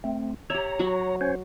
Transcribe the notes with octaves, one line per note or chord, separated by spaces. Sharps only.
A3 C4
G4 C#5 E5 A#5
F#3 F#4
C#4 C5 C#5